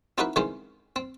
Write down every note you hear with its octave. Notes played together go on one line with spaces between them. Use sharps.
C4 D#4 E4 F#4 A#4 B4
D#3 E3 G#3 C4 C#4 C5
C4